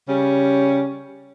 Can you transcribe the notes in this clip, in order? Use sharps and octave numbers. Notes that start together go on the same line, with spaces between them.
C#3 G3 C#4